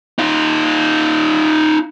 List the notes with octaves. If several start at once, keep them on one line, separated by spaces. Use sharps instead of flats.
D#4 F4